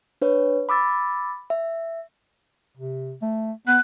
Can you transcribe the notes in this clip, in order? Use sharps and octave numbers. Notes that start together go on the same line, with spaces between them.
D4 B4 C#5
B5 D6 E6 A6
E5
C3
A3
B3 F#6